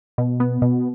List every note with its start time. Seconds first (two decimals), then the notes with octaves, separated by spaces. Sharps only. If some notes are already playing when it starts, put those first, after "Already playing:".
0.18 B2
0.40 B3
0.62 B2